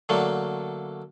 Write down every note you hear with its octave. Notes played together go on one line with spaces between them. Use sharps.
D3 F#3 A3 A#3